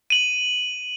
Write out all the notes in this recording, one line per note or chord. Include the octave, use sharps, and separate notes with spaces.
D#7 F#7